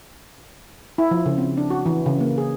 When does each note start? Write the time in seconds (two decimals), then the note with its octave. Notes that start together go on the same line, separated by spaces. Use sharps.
0.98 E4
1.11 F3
1.26 C#3
1.38 C4
1.57 D4
1.70 F#4
1.86 E3
2.06 C#3
2.20 A#3
2.38 G#4